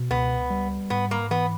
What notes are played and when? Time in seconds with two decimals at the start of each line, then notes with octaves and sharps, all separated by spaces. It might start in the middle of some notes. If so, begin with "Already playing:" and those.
Already playing: B2
0.10 C#2 B3
0.50 G3
0.90 G#2 B3
1.11 A#3
1.31 E3 B3